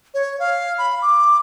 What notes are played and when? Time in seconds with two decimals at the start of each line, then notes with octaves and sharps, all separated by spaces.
0.14 C#5
0.40 F5
0.78 B5
1.02 D6